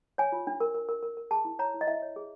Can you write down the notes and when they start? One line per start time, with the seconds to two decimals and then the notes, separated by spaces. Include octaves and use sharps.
0.18 C#5 G#5
0.32 F4
0.47 D4
0.60 A#4
0.74 A#4
0.89 A#4
1.03 A#4
1.17 A#4
1.31 G#4 A5
1.45 E4
1.59 C#5 A#5
1.74 E4
1.81 D#5
1.87 E4 E5
2.02 C#5
2.16 G#4